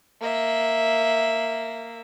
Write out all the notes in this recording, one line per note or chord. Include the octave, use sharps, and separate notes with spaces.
A#3 E5